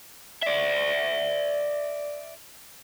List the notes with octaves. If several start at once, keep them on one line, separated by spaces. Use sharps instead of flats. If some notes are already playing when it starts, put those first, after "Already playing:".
D5 E5